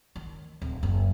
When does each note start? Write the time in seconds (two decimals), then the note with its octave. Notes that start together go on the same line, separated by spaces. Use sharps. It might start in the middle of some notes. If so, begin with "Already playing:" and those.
0.16 D#3
0.62 D1
0.83 F#1